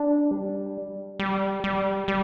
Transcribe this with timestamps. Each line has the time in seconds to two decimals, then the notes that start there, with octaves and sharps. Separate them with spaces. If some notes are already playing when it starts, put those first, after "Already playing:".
Already playing: D4
0.31 G3
1.19 G3
1.64 G3
2.08 G3